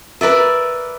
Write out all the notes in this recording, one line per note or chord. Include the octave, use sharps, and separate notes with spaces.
A#4 B4 D5 E5